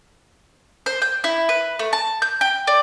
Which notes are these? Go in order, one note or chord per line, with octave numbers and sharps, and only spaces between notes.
C5
G5
E4
B4
A3
A5
G6
G5
D5